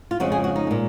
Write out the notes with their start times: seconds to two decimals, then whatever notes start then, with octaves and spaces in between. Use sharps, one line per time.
0.11 F4
0.20 F2 C#3 F3 G#3 F#4
0.32 G#4
0.44 F#4
0.56 D#4
0.67 A#2 G#3